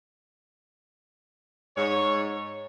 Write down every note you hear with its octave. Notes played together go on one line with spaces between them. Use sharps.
G#2 C#5